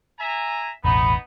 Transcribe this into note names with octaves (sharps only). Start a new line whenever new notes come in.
E5 G#5 A#5
E1 A1 B3 D#4 B5